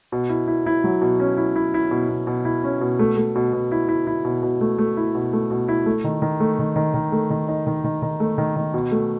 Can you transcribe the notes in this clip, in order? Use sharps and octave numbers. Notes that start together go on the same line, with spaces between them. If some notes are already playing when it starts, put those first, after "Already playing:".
B2
E4
E4
E4
F#3
B2
C#4
E4
E4
E4
B2
B2
B2
E4
C#4
B2
A3
A3
B2
B2
E4
E4
E4
B2
B2
A3
A3
E4
B2
A3
B2
E4
A3
D#3
D#3
A3
D#3
D#3
D#3
A3
D#3
D#4
D#3
D#3
D#3
A3
D#3
D#3
B2
A3